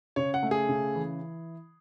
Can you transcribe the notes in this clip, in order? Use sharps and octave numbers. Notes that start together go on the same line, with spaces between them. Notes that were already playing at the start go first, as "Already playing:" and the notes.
C#3 C#5
F#5
A3
G#4
C#3
E3